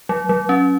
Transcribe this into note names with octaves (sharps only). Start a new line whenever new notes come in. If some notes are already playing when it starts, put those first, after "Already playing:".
F#3
F#3
C#4